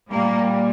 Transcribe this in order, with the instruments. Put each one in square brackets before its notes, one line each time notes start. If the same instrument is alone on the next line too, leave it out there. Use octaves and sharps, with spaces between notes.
[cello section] A#2 G3 A#3